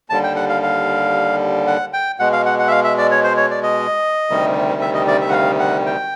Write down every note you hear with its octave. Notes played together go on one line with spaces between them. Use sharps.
D#2 D3 G3 A5
G5
F#5
F5
F5
F#5
G5
B2 G#3 F#5
F5
F#5
F#5
E5
F5
E5
D5
C#5
C5
C#5
D5
D#5
D2 C3 D#3 G3
E5
D#5
D5
E5
F#5
F5
F#5
G5